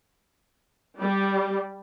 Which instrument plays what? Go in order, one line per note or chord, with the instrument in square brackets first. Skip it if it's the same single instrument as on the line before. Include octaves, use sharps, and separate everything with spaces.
[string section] G3